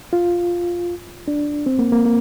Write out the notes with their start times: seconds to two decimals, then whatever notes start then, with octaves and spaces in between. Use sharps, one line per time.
0.13 F4
1.28 D4
1.66 C4
1.79 A#3
1.92 A#3
2.05 A#3